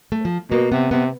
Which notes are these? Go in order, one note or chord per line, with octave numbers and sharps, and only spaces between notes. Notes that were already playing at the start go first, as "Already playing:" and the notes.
A3
F3
B2 A#3
C3 B3
C3 B3